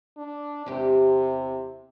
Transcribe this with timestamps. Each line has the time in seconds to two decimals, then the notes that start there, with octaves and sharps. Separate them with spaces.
0.17 D4
0.66 E2 C3 G4